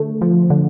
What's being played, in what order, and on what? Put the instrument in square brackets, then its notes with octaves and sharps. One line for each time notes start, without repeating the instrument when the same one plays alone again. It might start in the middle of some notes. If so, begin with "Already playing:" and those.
Already playing: [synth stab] D3 A3
F3
D3